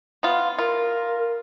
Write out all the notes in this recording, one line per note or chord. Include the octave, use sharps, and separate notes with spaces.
B3 F4
F4 A#4